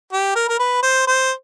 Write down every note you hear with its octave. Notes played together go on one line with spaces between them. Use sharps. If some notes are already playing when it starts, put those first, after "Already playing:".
G4
A#4
A#4
B4
C5
C5